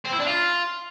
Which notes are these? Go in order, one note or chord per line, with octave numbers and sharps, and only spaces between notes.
C4
E4
D4
F4